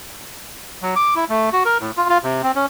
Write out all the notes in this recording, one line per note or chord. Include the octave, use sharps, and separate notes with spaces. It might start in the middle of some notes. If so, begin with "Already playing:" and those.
F#3
D6
E4
A3
F#4
A#4
A2
F4
F4
C3
C4
C#4